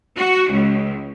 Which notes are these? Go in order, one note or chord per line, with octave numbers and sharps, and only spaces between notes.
F#4
C#2